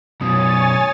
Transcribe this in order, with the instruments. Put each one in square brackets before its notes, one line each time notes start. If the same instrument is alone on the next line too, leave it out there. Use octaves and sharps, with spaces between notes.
[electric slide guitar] F#2 B2 [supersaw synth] C#5 G#5 A6 [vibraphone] D#6